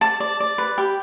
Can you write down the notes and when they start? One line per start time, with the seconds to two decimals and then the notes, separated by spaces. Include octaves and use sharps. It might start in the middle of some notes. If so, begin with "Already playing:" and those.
0.01 D5 A5
0.20 D5
0.40 D5
0.58 B4
0.78 G4